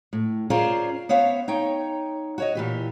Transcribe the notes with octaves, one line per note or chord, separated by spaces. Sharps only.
A2
C#4 F4 G#4 A#4 C5 D5
B3 C5 C#5 E5 F5
D#4 C#5 G5
F#4 C#5 D#5
A#2 E3 G4